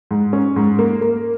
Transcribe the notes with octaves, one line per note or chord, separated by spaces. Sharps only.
G#2
C#4
G#2
A#3
A#3